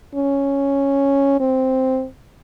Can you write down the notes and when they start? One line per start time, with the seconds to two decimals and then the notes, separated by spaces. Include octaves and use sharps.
0.15 C#4
1.40 C4